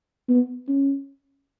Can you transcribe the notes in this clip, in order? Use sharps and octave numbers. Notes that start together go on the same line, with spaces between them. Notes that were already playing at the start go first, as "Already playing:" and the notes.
B3
C#4